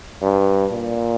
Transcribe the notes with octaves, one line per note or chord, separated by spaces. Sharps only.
G2
A#2